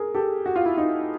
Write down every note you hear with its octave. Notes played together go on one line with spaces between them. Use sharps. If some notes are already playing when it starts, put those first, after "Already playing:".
Already playing: G#4 A#4
G4 A4
F#4
F4
E4 F#4
D#4 F4